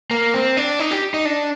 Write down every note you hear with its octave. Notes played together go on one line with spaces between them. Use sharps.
A#3
C4
D4
D#4
G4
D#4
D4